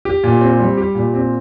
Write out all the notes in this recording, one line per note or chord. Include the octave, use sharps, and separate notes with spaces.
G4
A#2
C4
G3
G4
A#2
C4